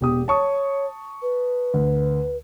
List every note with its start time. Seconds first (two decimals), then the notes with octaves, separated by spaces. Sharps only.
0.01 E1 B3 G4 D#6
0.28 C#5 A5 C#6 D#6
1.22 B4
1.74 D2